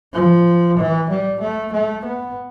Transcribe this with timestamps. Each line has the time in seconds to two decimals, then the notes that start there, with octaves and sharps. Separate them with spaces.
0.13 F3
0.78 E3
1.10 G3
1.41 A3
1.72 A3
2.05 B3